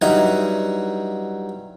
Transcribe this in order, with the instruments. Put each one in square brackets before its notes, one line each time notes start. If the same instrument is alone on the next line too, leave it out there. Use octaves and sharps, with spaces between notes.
[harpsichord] G2 F#3 D#4 E4 F#5